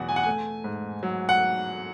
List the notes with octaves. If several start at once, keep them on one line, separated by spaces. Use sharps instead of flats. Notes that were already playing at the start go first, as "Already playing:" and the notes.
Already playing: E2 B2 F#3 F#5
G#5
F#5
A3 G#5
G#2
F#3
F#5